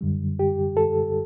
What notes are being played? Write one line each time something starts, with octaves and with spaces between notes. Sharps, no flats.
F#2 D3 G3
G4
A4